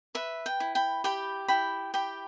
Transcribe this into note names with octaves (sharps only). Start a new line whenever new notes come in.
B4 E5
G5
E4
G5 B5
G4 G5 B5
E4 G5 B5
G4 G5 B5